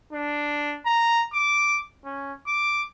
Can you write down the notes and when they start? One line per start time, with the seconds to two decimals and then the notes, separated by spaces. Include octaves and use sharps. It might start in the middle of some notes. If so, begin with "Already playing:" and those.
0.13 D4
0.85 A#5
1.33 D6
2.05 C#4
2.47 D6